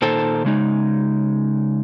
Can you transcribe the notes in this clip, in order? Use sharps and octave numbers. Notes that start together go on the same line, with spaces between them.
A#2 D#3 D#4 A4 C5 A5
C#3 G#3 D#4